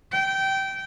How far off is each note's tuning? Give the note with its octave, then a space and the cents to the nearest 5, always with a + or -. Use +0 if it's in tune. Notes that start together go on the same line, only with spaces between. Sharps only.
G5 -20